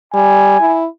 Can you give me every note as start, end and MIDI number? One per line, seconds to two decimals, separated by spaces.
0.14 0.58 55
0.14 0.80 80
0.60 0.86 64